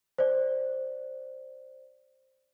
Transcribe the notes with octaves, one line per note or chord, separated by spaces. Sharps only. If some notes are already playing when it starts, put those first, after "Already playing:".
C5 D5